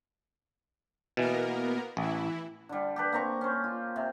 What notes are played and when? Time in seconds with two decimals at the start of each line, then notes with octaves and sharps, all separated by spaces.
1.17 B2 E3 A#3 B3 A#4
1.97 A1 E3 E4
2.69 D3 G3
2.96 G4 A4 B4
3.12 A#3 C4 A#5 C#6
3.41 C#4 C5
3.64 F4
3.96 C3